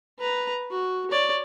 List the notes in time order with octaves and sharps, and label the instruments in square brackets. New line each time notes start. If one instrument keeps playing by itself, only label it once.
[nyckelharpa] B4 A#5
F#4
C#5 D5